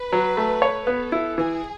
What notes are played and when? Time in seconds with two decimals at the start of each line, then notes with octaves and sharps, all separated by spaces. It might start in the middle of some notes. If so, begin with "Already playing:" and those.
Already playing: B4
0.12 F#3
0.37 A3
0.62 C#5
0.87 B3 A4
1.12 E4
1.38 E3 G#4